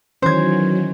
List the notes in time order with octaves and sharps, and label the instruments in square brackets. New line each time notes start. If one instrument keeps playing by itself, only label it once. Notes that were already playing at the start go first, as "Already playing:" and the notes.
[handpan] D#3 E3 C#4 [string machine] F#3 [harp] C5 G#6